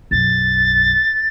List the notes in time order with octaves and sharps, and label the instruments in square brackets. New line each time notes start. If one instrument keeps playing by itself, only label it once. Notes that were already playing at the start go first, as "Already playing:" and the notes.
[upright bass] B1 F#2 [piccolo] A6